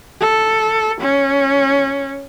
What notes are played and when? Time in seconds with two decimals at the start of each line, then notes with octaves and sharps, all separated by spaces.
0.21 A4
1.01 C#4